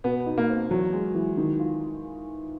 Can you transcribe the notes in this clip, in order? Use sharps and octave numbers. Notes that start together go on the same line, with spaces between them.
B2 B3
D#4
A#3
C4
E2 F#3
G#3
E3
D#3
F4